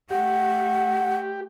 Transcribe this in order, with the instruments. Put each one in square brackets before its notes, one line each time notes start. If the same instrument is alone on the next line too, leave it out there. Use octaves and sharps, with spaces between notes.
[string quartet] A3 [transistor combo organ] G4 [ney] F#5